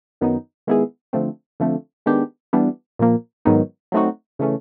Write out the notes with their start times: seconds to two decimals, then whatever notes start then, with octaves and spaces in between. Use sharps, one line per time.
0.21 F#2 D#3 F#3 B3 D#4
0.67 D#3 G#3 B3 E4 G#4
1.13 D3 F3 A3 C4
1.60 D3 F3 A3 C4
2.06 D#3 G#3 B3 D4 G4
2.53 E3 G3 B3 D4
2.99 A#2 F3 A#3
3.45 G#2 D#3 F#3 B3 D#4
3.92 F#3 A3 C4 D#4 F#4
4.39 C#3 E3 A3 C#4